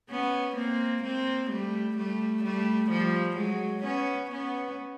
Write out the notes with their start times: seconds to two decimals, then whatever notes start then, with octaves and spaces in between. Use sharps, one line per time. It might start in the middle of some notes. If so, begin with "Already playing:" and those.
0.10 B3 C#4
0.56 A#3 C4
1.04 A#3 C4
1.50 G3 A3
1.97 G3 A3
2.43 G3 A3
2.91 F3 G3
3.37 F#3 G#3
3.84 B3 C#4
4.30 B3 C#4